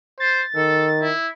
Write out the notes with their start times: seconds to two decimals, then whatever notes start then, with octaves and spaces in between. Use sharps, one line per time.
0.20 C5 A6
0.56 D#3 A4
1.01 E4